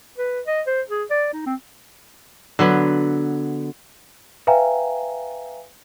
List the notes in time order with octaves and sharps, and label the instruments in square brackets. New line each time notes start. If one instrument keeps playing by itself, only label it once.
[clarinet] B4
D#5
C5
G#4
D5
D#4
C4
[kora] D3 F#3 B3
[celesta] B4 E5 F5 G5 G#5 A#5